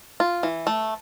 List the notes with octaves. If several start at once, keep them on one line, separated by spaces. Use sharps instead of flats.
F4
E3
A3